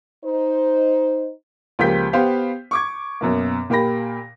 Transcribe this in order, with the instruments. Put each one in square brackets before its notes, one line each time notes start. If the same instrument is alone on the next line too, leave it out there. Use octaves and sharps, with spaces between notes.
[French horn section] D#4 C5
[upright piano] C#2 F3 A#3 G4 G6 B6
B3 G4 C5 F5
C#6 D6 G#6
F#2 B2 A#3
A#2 A#3 G4 B5 A#6